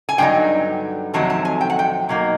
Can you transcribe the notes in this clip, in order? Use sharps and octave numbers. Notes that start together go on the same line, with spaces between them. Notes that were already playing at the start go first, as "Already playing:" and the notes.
G#5
G2 D3 F#3 B3 D#4 G5
F2 C3 D#3 F#3 A3 A5
A5
G#5
G5
F#5
G5
B2 F#3 A#3 D#4